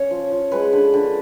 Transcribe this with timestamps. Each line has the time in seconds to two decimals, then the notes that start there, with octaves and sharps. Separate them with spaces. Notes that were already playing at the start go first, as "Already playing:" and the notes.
Already playing: C#4 C#5
0.11 F3
0.32 F3
0.52 G#3 B4
0.73 D3
0.94 D3